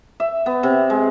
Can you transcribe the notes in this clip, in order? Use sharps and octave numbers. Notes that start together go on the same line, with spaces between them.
E5
B3
C3
G#3